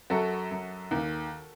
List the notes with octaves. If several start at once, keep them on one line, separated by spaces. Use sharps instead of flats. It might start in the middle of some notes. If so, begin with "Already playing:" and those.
F#2 F#4 A4
F#2
D#2